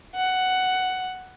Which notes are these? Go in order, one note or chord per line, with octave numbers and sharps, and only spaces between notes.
F#5